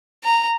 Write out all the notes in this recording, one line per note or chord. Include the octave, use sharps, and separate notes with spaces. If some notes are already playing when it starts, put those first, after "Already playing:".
A#5